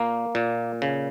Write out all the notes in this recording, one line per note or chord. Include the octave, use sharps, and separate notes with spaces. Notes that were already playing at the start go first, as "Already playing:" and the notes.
Already playing: A#2 A#3
A#2
C#3